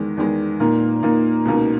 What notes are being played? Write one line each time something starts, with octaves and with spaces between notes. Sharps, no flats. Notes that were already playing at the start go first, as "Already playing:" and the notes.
Already playing: E2 D#3 G#3
E2 D#3 G#3
A#2 A#3 D#4
A#2 A#3 D#4
C#2 B2 A#3 D#4